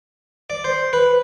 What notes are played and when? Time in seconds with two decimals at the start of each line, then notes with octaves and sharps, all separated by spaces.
0.50 D5
0.64 C5
0.93 B4